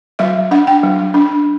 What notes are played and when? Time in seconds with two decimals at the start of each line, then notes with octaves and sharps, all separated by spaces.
0.19 F#3 E5
0.51 D4 F#5
0.67 G5
0.83 F#3
1.14 D4